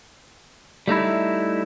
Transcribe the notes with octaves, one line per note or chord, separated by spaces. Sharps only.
G3 A3 D#4 E4